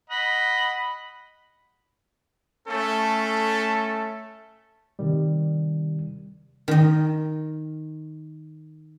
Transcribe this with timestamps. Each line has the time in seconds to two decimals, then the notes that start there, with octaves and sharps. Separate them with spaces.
0.10 D#5 F#5 B5
2.68 A3 C#4 A4
4.99 C3 D#3 G3
6.68 D#3 D#5